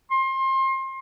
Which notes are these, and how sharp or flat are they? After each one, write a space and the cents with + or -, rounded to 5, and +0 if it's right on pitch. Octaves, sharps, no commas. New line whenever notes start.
C6 +30